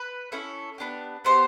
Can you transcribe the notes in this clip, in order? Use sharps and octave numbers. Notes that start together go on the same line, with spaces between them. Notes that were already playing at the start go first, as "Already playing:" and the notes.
Already playing: B4
C#4 E4 A4
B3 D4 G4
B3 D4 G4 C5